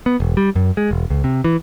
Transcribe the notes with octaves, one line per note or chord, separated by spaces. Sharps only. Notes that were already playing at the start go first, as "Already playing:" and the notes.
B3
E1
G3
F#2
G#3
E1
C#2
C3
E3